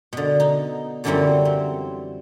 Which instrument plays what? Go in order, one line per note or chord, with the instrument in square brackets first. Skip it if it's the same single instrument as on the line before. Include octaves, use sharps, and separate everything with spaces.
[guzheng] B2 D3
D#4
F#2 D3 E3 F#3 G3 C4
C4